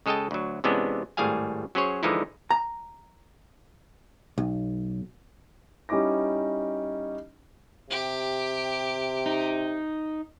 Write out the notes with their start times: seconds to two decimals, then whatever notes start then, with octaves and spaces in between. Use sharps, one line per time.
0.06 C#3 G#3 A4 D#5 G5 A5
0.31 D2 F#3
0.64 C3 E3 G#3 B3 C#4 D4
1.17 G#1 A2 G3 G#4 F5 G#5
1.75 F#3 C#4 G#4 C5 C#5
2.03 D3 E3 F3 G#3 D#4 E4
2.51 A#5
4.38 B1
5.89 G3 C#4 D#4 E4 D6 A#6
7.90 C3 G4
9.26 D#4